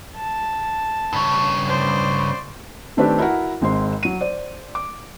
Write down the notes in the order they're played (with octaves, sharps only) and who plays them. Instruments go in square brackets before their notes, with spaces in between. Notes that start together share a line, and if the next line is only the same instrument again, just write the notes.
[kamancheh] A5
[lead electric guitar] G2 C#3
[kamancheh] C5 D5
[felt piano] D#3 A3 C4 D4 G4 B4
E4 F#4 A#4 F#5
G#1 G#3 C4 C6
F#3 D#7
C5 D5
D6